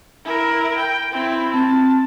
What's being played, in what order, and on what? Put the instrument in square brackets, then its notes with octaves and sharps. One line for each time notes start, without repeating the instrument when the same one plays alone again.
[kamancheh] E4 A#4
G5
C4 E4
[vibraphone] C4 [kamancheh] A5